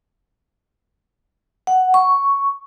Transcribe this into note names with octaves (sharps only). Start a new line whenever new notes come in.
F#5
C#6